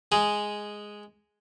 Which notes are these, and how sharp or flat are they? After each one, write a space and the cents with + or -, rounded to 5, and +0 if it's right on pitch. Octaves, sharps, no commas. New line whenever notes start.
G#3 +0 G#4 +0